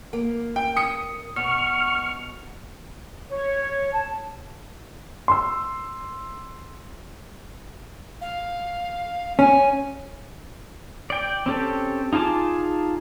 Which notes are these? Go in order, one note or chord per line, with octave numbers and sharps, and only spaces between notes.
A#3
G5
D#6 C#7
B2 C#6 F6
C#5
A5
C6 E6
F5
C#4 G#5
D5 G5
C4 C#4 G4 A4
D#4 F4 G#4 A5 D6